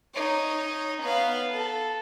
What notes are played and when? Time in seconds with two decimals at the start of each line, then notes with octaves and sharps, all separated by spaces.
0.14 D#4 C#5
1.03 B3 F5
1.50 A4